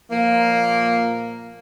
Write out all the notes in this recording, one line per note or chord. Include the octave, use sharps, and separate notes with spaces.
A#2 F3 A#3